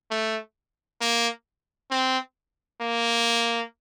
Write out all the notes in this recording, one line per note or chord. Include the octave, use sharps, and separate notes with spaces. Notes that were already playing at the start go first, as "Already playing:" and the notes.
A3
A#3
C4
A#3